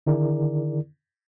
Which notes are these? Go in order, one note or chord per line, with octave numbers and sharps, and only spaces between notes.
D3 D#3 E4 G#4 A#4 D5